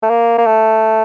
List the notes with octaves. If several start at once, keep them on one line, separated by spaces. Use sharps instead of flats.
A3
A#3
A#3
A3